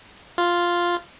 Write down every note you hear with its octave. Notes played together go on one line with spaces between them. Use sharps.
F4